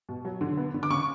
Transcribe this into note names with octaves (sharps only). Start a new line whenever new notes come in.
B2
F#3
D3
B3
D3
D6
C#3 C#6